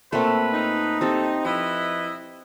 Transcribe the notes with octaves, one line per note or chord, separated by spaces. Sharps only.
A#2 A3 C4 B4
D#4
C4 G4 A4
F3 E4 B4 D#5 E5